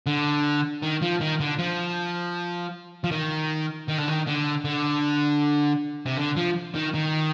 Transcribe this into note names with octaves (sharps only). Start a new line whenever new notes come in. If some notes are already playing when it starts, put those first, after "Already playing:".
D3
D#3
F3
D#3
D3
F3
F3
D#3
D#3
D3
D#3
D3
D3
C3
D3
F3
D#3
D#3